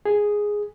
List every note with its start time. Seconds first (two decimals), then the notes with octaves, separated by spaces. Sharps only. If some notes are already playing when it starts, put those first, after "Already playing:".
0.06 G#4